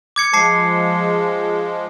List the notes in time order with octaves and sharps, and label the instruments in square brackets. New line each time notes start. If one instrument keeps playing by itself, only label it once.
[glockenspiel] D6 G#6 C#7
[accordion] F3 G#3 [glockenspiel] A5 D6 C7